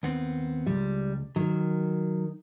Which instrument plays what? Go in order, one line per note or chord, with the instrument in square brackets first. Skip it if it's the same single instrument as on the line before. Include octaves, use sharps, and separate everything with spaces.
[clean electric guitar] D#2 B3 C4
[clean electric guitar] C#2 [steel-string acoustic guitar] G3
[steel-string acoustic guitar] D#3 [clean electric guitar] F#3